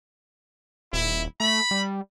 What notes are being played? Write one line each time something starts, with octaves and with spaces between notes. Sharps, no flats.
D#1 E4
A3 B5
G3